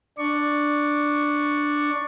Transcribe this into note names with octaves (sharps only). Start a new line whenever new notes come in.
D4 D5 C#6